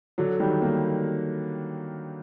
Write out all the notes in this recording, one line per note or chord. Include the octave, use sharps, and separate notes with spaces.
D3 F#3
D#3 G3
G3 A#3